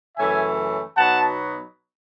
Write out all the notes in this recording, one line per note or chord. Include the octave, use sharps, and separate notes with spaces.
F#2 C#3 E3 A3 C#4 E5 G#5
B2 F#3 B3 D#4 F#5 A5